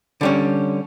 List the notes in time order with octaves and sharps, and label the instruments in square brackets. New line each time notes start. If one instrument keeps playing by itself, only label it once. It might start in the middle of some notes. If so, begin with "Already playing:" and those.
[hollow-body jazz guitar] D3 G3 C#4